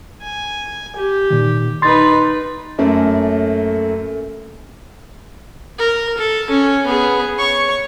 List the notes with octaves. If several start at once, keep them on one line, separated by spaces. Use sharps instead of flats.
G#5
G4
A#2 D#3
D#4 B4 C6 A6
F#2 A3 A#3 C#4
A#4
A4
C#4
B3 G#4
C#5 C#6